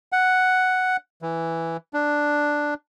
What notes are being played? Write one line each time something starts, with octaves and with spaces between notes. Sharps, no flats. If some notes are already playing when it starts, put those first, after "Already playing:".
F#5
E3
D4